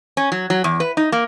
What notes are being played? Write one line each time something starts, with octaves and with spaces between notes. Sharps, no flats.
C#4
F#3
F#3
E2
B4
D#4
A#3